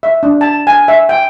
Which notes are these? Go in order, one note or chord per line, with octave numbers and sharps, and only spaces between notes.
E5
D4
A5
G#5
E5
G5